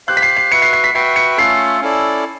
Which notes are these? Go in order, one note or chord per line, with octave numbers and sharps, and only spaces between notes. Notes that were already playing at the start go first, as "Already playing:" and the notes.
G4 C5 F5 F#6
B6
C7
C7
F#4 B4 E5 C#7
C7
C7
B6
F#4 B4 E5 G5 C7
C#7
A3 C#4 F4 A4 C7
C#4 E4 A4 D5